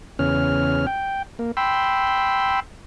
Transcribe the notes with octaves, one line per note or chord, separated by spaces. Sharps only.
E2 C#3 C#4 F6
G5
A#3
G5 B5 C6 E6